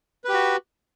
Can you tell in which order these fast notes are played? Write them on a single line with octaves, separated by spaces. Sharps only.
B4 G4 F#4